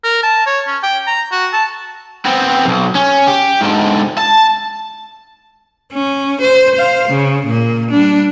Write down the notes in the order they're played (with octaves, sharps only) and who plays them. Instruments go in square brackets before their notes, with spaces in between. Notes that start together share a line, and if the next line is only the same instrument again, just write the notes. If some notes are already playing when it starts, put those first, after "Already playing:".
[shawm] A#4
A5
C#5
C#4
G5
A#5
F#4
A5
[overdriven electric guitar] B3 C4
B1 F#2
C#4
G4
G#2 D3
A5
[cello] C#4
C5
C5 F5
C#3
A#2 A#3
G3 D4